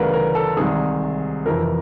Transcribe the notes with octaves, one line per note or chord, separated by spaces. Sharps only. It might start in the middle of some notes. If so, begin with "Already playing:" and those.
Already playing: D2 C#3 E3 G3 A#4 B4 F5
A#4
A4
C2 C3 D#3 G#3 G#4
F2 C3 E3 A#4